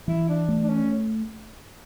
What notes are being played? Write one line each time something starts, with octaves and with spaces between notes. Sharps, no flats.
E3 E4
D4
A3
D4
C#4